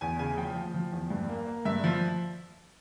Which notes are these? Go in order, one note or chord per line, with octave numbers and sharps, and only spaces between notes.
E2 G#5
C#3 G#5
F3 G5
F3
F3
E2
G2
A#3
A#3
G2 E5
F3